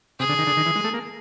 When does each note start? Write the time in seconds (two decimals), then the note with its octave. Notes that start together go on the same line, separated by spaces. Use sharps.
0.19 C3 G#4
0.29 D3
0.39 D#3
0.47 D3
0.57 D#3
0.66 E3
0.76 G#3
0.84 A3
0.94 A#3